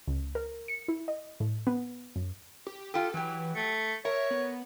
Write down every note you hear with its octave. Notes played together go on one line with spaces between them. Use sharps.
C#2
A#4
C#7
E4
D#5
A2
B3
F#2
G4
F4 G4 A4
E3 F#3 G4
A3 C#7
A#4 C#5 E5
B3